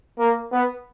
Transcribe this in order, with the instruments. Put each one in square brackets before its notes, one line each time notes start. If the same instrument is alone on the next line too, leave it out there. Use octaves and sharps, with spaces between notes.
[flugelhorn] A#3
B3